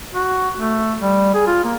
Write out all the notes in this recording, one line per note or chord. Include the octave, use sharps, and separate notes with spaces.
F#4
A3
G3
G#4
F4
A#3